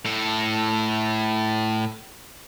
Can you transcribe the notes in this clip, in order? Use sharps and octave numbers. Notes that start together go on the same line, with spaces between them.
A2 A4